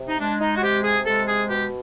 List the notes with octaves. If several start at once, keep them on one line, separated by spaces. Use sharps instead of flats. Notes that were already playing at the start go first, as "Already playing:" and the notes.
Already playing: C3
D#4
G#3 D4
D#4
F#4
C3 G4
G#4
G#3 A4
G#4
B2 G4